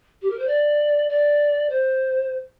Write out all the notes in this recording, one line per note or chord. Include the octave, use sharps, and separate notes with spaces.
G4
A#4
C5
D5
D5
C5